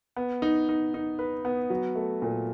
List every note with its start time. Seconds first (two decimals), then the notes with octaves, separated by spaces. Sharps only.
0.16 B3
0.42 D#4
0.69 D#4
0.94 D#4
1.19 B4
1.45 B3
1.70 F#3
1.95 A3
2.22 A#2